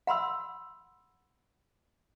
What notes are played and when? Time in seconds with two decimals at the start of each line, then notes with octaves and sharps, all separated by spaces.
0.07 F#5 B5 C6 E6